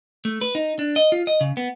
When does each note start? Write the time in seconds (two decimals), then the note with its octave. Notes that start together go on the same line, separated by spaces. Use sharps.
0.25 A3
0.41 B4
0.55 D#4
0.79 D4
0.96 D#5
1.12 F4
1.27 D#5
1.41 C#3
1.57 B3